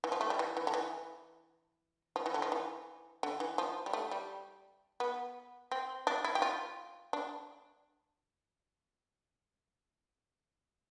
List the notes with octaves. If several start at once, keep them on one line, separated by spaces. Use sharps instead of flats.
E3
F3
A3
G3
E3
E3
D3
E3
F3
E3
D3
F3
E3
D3
E3
F3
G3
A3
G3
B3
C4
D4
E4
G4
F4
D4